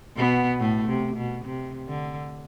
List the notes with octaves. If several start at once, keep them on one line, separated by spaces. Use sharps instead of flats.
B2 B3
A2 A3
C3
B2
C3
D3